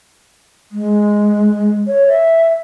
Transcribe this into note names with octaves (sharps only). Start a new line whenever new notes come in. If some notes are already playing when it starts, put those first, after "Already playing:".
G#3
C#5
E5